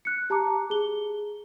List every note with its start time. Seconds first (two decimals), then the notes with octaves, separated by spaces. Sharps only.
0.05 F#6 C#7
0.30 G4 A5 A#5 D6
0.70 G#4 G7